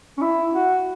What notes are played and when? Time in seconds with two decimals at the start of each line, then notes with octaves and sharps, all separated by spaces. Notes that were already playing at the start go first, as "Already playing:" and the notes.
0.18 C#4
0.22 E4
0.53 F#4